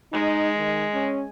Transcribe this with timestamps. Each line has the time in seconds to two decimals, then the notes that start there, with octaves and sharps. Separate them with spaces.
0.13 G#3 D#4
0.56 D#3
0.94 C#4